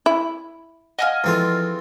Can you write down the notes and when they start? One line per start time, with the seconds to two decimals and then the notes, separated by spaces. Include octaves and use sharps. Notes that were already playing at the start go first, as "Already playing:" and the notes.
0.06 E4
0.99 D#5 F5 F#5 G#5 F6
1.24 E2 F3 C4 F4 A4